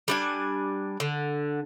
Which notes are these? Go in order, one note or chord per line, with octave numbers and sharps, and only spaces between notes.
G3 D4 G#5
D3